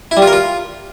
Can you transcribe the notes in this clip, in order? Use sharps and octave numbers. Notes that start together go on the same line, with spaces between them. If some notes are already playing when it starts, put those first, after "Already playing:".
E4
G3
F4
A#4
F4